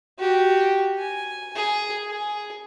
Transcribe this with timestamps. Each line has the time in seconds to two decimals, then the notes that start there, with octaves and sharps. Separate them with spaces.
0.19 F#4 G4
0.98 G#5
1.56 G#4
2.08 G#4